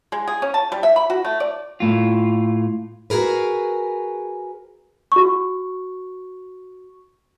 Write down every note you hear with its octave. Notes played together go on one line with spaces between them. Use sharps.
G#3
G#4
C#4
A5
G3
E5
B5
F#4
A3
D5
A2 F4
F#4 G#4 A#4 B4
F#4 C#6